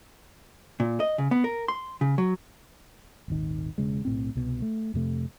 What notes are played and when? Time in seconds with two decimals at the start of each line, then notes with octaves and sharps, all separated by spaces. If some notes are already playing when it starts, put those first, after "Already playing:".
0.80 A#2
1.00 D#5
1.18 C#3
1.31 B3
1.44 A#4
1.68 C6
2.01 C#3
2.18 F#3
3.28 D#1 G#1 D#3
3.78 E1 C#3 G#3
4.05 B1 A2 C4
4.35 C2 B2
4.62 A3
4.94 F2 C3 A3